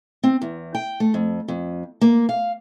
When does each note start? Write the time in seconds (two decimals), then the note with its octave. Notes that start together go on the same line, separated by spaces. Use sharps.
0.24 C4
0.42 E2
0.75 G5
1.00 A3
1.14 F2
1.48 F2
2.01 A#3
2.29 F5